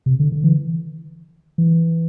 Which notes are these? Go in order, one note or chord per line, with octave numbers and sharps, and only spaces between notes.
C3
D3
D3
E3
E3